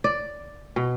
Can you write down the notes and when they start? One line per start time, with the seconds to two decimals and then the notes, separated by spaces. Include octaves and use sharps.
0.04 D5
0.76 B2